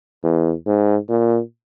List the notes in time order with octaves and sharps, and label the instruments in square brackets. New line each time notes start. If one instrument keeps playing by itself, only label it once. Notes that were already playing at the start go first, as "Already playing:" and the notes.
[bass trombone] E2
G#2
A#2